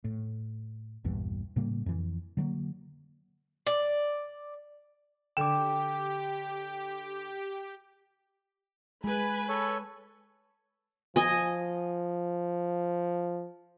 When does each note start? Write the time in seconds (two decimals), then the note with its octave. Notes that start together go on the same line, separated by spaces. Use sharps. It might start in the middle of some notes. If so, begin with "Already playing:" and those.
0.04 A2
1.04 A#1 E2 G2 E3
1.56 A2 C#3 G3 A#3
1.86 F2 E3
2.37 D3 F#3 A3 A#3
3.67 D5
5.37 D3 G4 G5 D6 E7
9.04 G#3 B4 G#5 B5
9.49 A4 C#5
11.16 F3 D#5 G#5